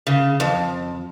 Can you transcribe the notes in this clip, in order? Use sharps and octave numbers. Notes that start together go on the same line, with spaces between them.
C#3
F2